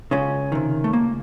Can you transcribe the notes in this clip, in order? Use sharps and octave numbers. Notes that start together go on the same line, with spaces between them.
C#2 C#3 C#4
C3 D#3
A3
C#2 A#3